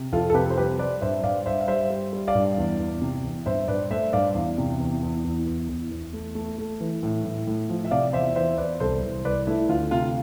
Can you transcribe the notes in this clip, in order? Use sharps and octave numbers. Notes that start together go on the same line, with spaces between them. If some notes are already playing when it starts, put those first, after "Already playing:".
Already playing: C3
F2 F4 A4
A4
C3 G4 B4
C5
G3 G4 B4
G3 B4 D5
G2 C5 E5
G2 D5 F5
G2 C5 E5
F5
G3 C5 E5
G3
G3
D5 F5
G2
E2
E2
C3
E2
G2 C5 E5
G2 B4 D5
A3 C5 E5
G2 D5 F5
E2
C3
E2
E2
E2
E2
E2
E2
A3
A3
A3
E3
A2
A2
A2
F3
E5
C3 D5 F5
E2 C5 E5
E3 C5 E5
E2 B4 D5
C2 A4 C5
C2
C2 B4 D5
A3 E4
D2 F4
C3 F4